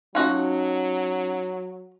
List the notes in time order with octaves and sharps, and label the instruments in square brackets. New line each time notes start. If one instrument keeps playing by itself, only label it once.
[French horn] F#3 [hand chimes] C#4 D#4 [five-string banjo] F4 F#4 D#5